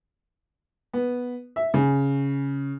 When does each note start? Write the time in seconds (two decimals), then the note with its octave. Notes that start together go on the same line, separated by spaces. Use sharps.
0.93 B3
1.56 E5
1.74 C#3